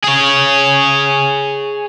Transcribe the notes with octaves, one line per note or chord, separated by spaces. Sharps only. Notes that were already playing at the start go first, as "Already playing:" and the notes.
G#4 C#5